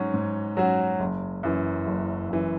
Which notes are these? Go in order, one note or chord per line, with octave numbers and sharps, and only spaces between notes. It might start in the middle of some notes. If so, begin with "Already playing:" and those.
Already playing: G#2 F#3 C#4 F#4
G#2
F#3 C#4 F#4
F#1
F#2 E3
F#1
F#2 E3